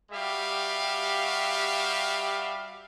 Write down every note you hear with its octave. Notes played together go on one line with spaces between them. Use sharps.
G3 F#4 G4 E5 F5